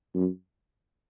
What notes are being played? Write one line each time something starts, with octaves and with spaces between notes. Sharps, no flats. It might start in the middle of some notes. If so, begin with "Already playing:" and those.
F#2